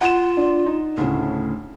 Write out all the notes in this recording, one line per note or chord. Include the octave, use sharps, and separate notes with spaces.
F4 F#5 E7
D4
D#4
D2 A2 C#3 D4